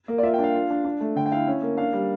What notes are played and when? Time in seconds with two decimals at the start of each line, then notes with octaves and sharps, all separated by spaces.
0.08 A#3
0.18 D5
0.23 F4 E5
0.34 G5
0.39 D4 F5
0.54 F4
0.70 D4
0.85 D4
1.00 A3
1.16 D3 G5
1.26 G5
1.32 E4 F5
1.47 C#4
1.62 A#3
1.77 D4 F5
1.93 G3